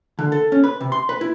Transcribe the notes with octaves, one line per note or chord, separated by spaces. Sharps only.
D3
A4
C#4
B4
C3
C6
B4
E4